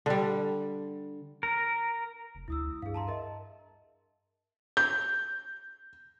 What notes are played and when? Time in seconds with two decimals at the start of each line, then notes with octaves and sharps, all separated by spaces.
0.06 D3 G3
1.43 A#4
2.35 F1
2.48 D2 E4 D#6 E6
2.82 G2 G#4 F5
2.94 A5 A#5 C6
3.07 A#4 D#5 E5
4.77 G6